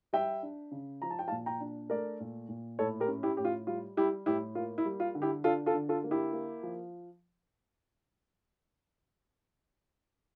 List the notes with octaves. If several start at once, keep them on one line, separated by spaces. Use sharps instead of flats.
G3 E5 G5
D4
C#3
F3 A#5
A5
G5
F5 A5
A#2
G5 A#5
D4
A3 A#4 D5
A#2
A#2
A2 A4 C#5
G4 A#4
C#4
E4 G4
A2 G4
F4
G3 F4
G3 E4 G4
A2 E4 G4
A#3 F4
E4
G3
F4
D3
E4 G4
D4 F4 A4
F4 A4
D3
F4 A4
A#3
E4 G4
A#3
F3